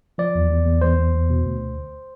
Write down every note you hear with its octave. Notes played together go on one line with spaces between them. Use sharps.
F3 D5
E2
E2
E2
E2 C5
E2
E2
B2
D2